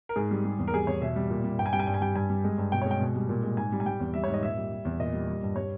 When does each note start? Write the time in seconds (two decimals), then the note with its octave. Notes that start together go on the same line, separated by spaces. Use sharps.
0.09 A#4
0.16 G#2 G#4
0.31 G3
0.45 G3
0.59 E2
0.68 A#4
0.74 G3 G#4
0.87 E2 C#5
1.02 B2 E5
1.16 G3
1.30 A#2
1.44 G3
1.59 G2 G5
1.66 G#5
1.73 G3 G5
1.79 G#5
1.87 G2 G5
1.94 G#5
2.01 G3 G5
2.15 G2 G#5
2.30 G3
2.44 G#3
2.58 G2
2.72 B2 G5
2.82 C#5
2.86 G#3
2.91 G5
3.01 B2
3.15 G3
3.29 A#2
3.43 G#3
3.57 G#2 G#5
3.72 G3
3.80 G#5
3.86 G3 G5
4.00 E2
4.14 G3 E5
4.24 C#5
4.28 G#2
4.34 D#5
4.42 A#2 E5
4.57 G3
4.72 G3
4.85 E2
4.99 A#2 D#5
5.13 G3
5.28 G3
5.43 G2
5.56 G3 C#5